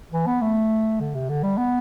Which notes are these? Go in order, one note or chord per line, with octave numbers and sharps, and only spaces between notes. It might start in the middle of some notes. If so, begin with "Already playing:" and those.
E3
B3
A3
D3
C3
D3
G3
B3